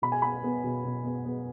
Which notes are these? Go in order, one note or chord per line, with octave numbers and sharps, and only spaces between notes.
B2 B5
G#5
B3 B5
B3
B2
B2
B3
B3